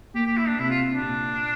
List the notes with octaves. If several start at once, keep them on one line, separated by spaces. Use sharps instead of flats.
A#3 G4
G4
E4
D4
C3 E4
F4
D4
A#2